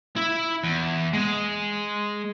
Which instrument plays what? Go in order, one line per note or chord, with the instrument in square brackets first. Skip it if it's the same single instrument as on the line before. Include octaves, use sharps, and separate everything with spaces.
[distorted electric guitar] E4 E5
E2
G#3